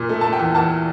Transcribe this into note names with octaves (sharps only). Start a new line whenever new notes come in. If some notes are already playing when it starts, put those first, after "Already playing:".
Already playing: A#2
A3
A3 A5
G5
E2
E2 A5